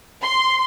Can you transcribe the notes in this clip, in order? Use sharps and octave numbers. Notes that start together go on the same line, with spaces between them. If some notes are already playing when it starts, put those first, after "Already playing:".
C6